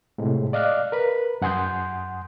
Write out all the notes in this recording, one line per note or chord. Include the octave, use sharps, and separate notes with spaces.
A2 C3 G#3
D5 D#5 F5 D6 F6 F#6
A#4 B4 B5
F#2 F#5 G#5 C6 D#6 G6